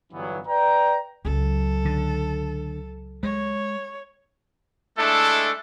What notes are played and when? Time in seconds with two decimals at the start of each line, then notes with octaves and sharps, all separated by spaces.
0.13 G1 G2 E3 F#3 B3
0.47 B4 D5 G5 A#5
1.25 C#2 F#3 A4
1.85 D3
3.23 G#3 C#5
4.97 G#3 A3 D4 E4 A4